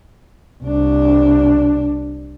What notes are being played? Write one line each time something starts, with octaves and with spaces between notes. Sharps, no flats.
C2 D4